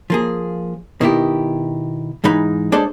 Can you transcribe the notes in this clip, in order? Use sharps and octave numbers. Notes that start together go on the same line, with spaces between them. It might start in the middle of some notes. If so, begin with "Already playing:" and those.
F3 A#3 G#4
B2 D#3 E4 G4
G#2 E3 G#3 D#4 B5
G#3 D4 G#4 A4 C5 D5